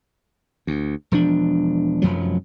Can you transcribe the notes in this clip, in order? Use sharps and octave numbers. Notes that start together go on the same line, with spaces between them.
D2
E1 F3 D4
F1 F#2 F3 F#3